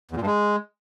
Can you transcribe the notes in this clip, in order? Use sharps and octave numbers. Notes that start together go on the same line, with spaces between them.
E2
A#2
G2
G#3